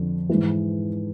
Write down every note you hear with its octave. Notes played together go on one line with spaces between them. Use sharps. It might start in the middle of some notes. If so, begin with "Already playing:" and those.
Already playing: F2 D3 F3
G#2 E3